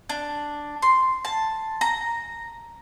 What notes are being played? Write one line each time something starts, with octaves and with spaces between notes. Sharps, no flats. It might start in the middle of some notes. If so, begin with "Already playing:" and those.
D4
C6
A5
A#5